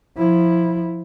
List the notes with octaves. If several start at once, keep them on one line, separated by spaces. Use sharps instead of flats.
F3 E4